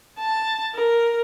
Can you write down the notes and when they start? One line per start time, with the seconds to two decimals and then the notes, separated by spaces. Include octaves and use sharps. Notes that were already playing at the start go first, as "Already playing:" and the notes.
0.18 A5
0.75 A#4